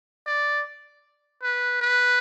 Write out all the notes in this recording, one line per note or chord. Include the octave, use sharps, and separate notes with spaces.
D5
B4
B4